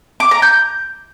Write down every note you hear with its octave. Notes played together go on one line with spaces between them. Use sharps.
D6
A#5
G6